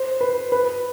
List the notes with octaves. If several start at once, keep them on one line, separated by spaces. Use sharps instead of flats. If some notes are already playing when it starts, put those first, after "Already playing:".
Already playing: C5
B4
B4